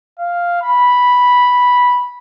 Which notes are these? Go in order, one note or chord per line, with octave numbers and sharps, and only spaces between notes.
F5
B5